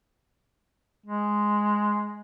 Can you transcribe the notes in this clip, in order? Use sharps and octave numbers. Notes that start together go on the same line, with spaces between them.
G#3